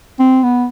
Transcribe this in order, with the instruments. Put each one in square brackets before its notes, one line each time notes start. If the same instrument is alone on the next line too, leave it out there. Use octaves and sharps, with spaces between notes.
[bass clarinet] C4
B3